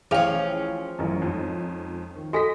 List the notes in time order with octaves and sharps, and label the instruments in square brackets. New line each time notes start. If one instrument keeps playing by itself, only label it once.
[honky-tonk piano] A1 G5 F7 [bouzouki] F3 C#4 [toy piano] G#4 F5 G#5
[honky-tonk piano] A1 F#2
F2 G#2
D#3
[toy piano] F#4 A4 G#5 [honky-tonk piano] D#5 A#6 B6